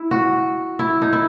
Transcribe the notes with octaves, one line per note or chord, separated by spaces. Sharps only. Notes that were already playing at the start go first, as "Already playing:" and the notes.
Already playing: E4
F#4
E4
D#4
E4